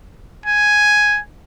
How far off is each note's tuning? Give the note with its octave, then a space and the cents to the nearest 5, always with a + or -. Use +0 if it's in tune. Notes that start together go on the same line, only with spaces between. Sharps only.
G#5 +5